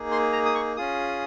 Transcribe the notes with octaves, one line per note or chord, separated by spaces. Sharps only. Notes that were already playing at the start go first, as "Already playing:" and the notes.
Already playing: A#3 D#4 G#4
C6
A#5
D#6
C#6
C#4 F4 G#4 D#6